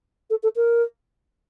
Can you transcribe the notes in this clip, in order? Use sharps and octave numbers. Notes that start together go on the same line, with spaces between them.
A4
A4
A#4